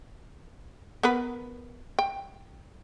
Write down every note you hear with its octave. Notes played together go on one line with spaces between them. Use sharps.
B3 A#4 B4
G5